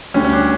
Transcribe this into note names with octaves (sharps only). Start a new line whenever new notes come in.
D2 D3 G3 C#4
C#4
D4